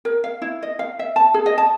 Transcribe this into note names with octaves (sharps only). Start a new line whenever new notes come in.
A#4
F5
E4
D#5
F5
E5
A5
G#4
D#5
A5